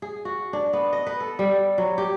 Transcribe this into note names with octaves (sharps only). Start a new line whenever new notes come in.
G#4
F#4
D4
B3
D#5
B4
A4
G3
F#3
G4